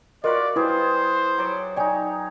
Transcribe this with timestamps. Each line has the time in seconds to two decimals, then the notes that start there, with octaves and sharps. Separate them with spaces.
0.24 F4 F#4 A#4 B4 D5 D#5
0.56 G3 E4 G#4 B4 C5
1.38 F#3 D5
1.77 D#4 C#5 D5 G5 G#5